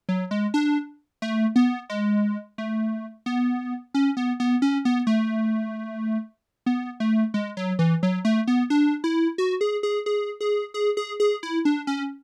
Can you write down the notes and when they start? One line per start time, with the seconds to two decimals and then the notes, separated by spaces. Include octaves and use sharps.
0.09 F#3
0.31 G#3
0.54 D4
1.22 A3
1.56 B3
1.90 G#3
2.58 A3
3.26 B3
3.94 C#4
4.17 B3
4.40 B3
4.62 C#4
4.85 B3
5.07 A3
6.66 B3
7.00 A3
7.34 G#3
7.57 F#3
7.79 E3
8.03 F#3
8.25 A3
8.48 B3
8.70 D4
9.04 E4
9.38 F#4
9.61 G#4
9.83 G#4
10.06 G#4
10.41 G#4
10.74 G#4
10.97 G#4
11.20 G#4
11.43 E4
11.65 D4
11.87 C#4